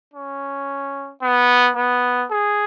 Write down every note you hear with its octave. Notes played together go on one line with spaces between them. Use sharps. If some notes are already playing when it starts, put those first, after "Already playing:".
C#4
B3
B3
G#4